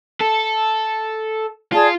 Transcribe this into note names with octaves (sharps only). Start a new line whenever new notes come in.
A4
F4 G#4 D5 A5